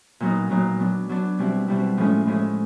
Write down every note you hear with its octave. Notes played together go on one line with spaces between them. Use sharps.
A#2 F#3 B3 D#4
A#2 F#3 B3 D#4
F#3 B3 D4
F#3 B3 D4
B2 G3 C4 E4
B2 G3 C4 E4
A2 F3 G#3 C#4 E4
A2 F3 G#3 C#4 E4